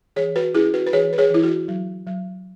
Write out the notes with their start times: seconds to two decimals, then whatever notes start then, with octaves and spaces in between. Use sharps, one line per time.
0.16 E3 G#4 C#5
0.36 F#4 B4
0.55 C#4 E4 G#4
0.74 F#4 B4
0.87 B4
0.93 E3 G#4 C#5
1.13 B4
1.18 G#4 C#5
1.31 E3 E4
1.43 F#4
1.68 F#3
2.07 F#3